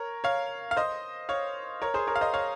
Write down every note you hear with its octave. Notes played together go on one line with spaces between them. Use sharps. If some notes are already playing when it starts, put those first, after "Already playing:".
Already playing: A#4 C#5
C#5 F5
F5
C5 D#5
C#5 F5
A#4 C#5
G#4 C5
A#4 C#5
F5
C5 D#5
C#5 F5